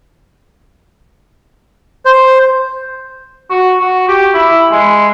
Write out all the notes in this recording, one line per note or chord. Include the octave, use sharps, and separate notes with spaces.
C5
F#4
F#4
G4
E4
G#3